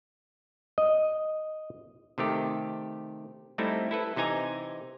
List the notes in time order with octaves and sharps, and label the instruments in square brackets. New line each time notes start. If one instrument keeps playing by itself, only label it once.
[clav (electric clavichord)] D#5
C3 D#3 A3 G4
G3 A3 C4 D#4 E4
E4 A4 B4
C3 E3 D#4 G#5 A#5